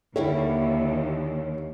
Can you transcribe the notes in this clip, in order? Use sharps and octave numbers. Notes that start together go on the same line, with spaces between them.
D#2 D3 G3 E4 C#5